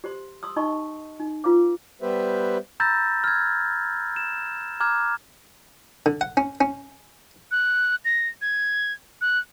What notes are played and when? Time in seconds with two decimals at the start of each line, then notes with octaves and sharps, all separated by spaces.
0.04 G4 C5 C6
0.43 C6 D#6 E6
0.56 D#4 D#5 A5 B5 C#6
1.20 D#4
1.44 F4 B4 F5 D6
2.02 G3 B3 G4 B4 C5 E5
2.80 A#5 B5 E6 G6 A6 A#6
3.24 F6 G#6
4.16 E7
4.80 A#5 D6 F6 F#6 G#6
6.06 D3
6.21 F#5
6.37 C#4
6.61 C#4
7.51 F#6
8.05 A#6
8.42 G#6
9.21 F#6